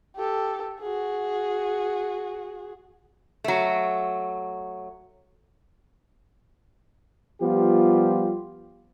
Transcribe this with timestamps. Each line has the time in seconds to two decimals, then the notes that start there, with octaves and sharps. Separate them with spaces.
0.16 G4 A4
0.80 F#4 G#4
3.44 F#3 A3
7.41 F3 G3 B3 F4 G4